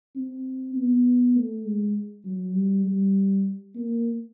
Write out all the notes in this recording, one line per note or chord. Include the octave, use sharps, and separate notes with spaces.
C4
B3
A3
G#3
F#3
G3
G3
A#3